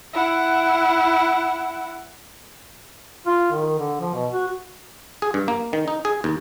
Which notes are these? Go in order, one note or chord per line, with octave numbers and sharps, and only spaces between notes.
E4 F#5
F4
D#3
D3
F3
B2
F#4
G#4
G2
A#3
D#3
D#4
G#4
D#2